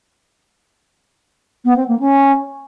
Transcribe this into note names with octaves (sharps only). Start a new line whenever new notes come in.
B3
C4
A#3
C#4